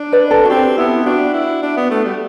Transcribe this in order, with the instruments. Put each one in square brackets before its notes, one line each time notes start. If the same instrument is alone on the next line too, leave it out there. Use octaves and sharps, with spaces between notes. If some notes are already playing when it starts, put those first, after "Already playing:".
Already playing: [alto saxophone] D4
[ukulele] B4 D5
A4
F#4
[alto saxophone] C4 [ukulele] G4
[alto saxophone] B3 [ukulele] E4
[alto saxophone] D4 [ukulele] F#4
[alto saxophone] E4
D4
B3
A3
G3